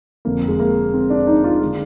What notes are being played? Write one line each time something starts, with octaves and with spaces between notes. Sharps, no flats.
F1 F2 D3 A#3
G#3
A#3
C4
D4
D#4
F4
G#3
D3